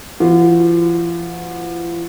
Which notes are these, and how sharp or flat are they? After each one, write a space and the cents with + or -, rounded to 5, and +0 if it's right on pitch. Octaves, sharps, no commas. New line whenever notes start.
F3 -45 F#4 -30